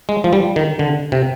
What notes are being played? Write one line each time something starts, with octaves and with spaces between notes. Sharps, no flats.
G#3
F3
G3
D#3
D3
C3